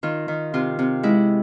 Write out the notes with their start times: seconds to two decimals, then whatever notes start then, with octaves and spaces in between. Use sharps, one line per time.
0.03 D#3 F4
0.28 D#3
0.54 C3 F4
0.79 C3
1.03 G#3 E4